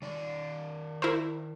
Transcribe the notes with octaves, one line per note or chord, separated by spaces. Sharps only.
D#3 D5
E4 A#4 C5